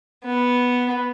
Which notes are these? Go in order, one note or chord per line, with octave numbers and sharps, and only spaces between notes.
B3